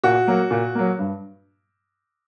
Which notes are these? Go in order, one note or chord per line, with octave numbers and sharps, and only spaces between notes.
A#2 F#4
F#3 A#3
A#2
F#3 A#3
G2